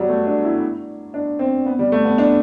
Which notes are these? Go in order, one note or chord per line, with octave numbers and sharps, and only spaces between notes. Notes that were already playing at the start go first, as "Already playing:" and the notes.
Already playing: F#3 G3
A3
D4
E4
D4
C4
B3
G3
A3
B3
D4